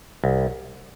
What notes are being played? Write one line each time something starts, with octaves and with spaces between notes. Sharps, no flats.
C2